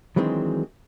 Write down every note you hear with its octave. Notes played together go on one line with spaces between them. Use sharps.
D#3 E3 F#3 G#3 C4 D4